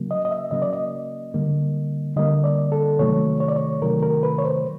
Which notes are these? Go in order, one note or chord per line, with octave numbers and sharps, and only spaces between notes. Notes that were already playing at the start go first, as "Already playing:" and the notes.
Already playing: C#3 F#3 A#3
D#5
D#5
E5
C#3 F#3 A#3 D#5
D5
D#5
D3 G3 A#3
D3 G3 A#3 D#5
D5
A4
C3 D#3 F#3 A3 C#5
C#5
D5
C#5
C3 D#3 F#3 A3 A#4
A#4
B4
C#5
C5